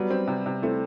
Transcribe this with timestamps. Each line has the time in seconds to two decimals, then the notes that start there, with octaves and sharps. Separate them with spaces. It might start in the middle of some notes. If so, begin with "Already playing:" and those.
Already playing: F#3 G3 B3
0.10 C4
0.27 C3
0.46 C3
0.62 A3 C4 E4